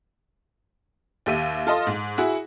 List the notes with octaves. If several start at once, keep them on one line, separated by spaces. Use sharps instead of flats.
D#2 G4 E5 D#7
F4 A4 D#5 C6
G#2
E4 F#4 G#4